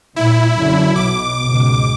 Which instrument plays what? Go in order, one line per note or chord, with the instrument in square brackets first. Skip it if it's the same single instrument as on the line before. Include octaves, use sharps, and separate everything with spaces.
[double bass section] C2 A#2 [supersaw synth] E4
[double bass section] F#2 D3 F#3
[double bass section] B1 B2 [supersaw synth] D6
[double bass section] C#2 G#2 B2